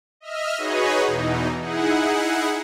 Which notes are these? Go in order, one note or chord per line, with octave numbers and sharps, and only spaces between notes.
D#5 E5 F6
D#4 F#4 G#4 B4 C#5 D#5
E2 B2 E3 D#4
D#4 E4 G#4 F#5